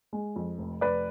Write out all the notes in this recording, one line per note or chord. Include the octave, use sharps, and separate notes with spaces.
G#3
F2
F1
F1 B4 D5